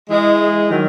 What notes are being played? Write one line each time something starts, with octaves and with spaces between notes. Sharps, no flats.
E3 G#3
D#3 F#3